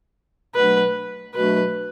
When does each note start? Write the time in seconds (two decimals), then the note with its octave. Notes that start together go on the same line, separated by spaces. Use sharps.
0.55 B2 F#3 A3 D4 F#4 B4
1.35 B2 F#3 A3 D4 F#4 B4